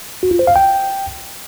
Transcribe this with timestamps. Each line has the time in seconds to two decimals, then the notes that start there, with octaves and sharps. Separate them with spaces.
0.23 F#4
0.31 F4
0.39 C5
0.47 F5
0.56 G5